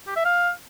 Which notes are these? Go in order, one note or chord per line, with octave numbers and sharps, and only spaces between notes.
G4
E5
F5